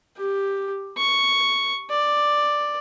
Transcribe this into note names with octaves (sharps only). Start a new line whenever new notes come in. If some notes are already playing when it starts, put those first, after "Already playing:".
G4
C#6
D5